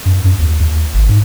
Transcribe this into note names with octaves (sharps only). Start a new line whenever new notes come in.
F#2
F#2
D#2
D#2
G#1
G#2